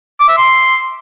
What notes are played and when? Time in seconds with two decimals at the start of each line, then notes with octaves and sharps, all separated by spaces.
0.20 D6
0.29 E5
0.37 C6